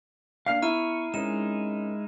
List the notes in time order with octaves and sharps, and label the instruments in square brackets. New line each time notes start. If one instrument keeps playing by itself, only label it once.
[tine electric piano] A#3 D4 D5 [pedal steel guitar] F5 [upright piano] F6 C7
[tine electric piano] B3 [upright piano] E4 [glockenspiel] A#5 F6 D#7 [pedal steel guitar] C#6
[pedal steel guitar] G#3 D#4 [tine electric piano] C4 C#4 A#4 [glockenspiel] E7